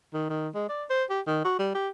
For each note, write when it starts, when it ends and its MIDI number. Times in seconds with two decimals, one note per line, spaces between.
0.13 0.27 51
0.30 0.49 51
0.54 0.67 56
0.69 0.85 74
0.90 1.04 72
1.10 1.21 67
1.27 1.43 51
1.45 1.57 66
1.59 1.73 55
1.75 1.89 67